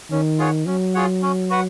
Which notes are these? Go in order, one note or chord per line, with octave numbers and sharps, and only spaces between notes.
D#3 C#4
F4 G#4 C#5 F#5
F#3 C#4
F4 G#4 C#5 F#5
C#4
F#4 B4 F#5